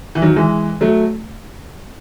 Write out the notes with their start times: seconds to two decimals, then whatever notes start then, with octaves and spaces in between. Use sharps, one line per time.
0.15 E3
0.22 D#3 F#3
0.36 E3 G#3
0.81 F#3 A3